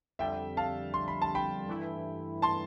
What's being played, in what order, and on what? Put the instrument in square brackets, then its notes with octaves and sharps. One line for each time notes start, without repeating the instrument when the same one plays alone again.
[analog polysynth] F2 D3 G3 [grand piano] E5 G5
[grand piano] F5 A5
C6
B5
A5
G5 B5
[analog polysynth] G2 E3 A3 E4
[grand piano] A5 C6